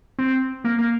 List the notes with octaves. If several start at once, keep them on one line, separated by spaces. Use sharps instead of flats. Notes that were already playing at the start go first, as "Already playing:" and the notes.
C4
A#3
A#3